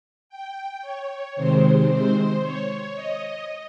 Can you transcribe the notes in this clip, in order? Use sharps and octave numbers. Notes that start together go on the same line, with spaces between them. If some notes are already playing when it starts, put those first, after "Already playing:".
G5
C#5
C3 D#3 G#3 C4 C5
C5
C#5
D#5